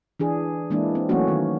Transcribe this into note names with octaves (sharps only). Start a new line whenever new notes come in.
E3 D4 G#4
E3 G#3 A#3 D4 E4
C4
E3 F#3 A3 A#3 C#4 F#4
D#3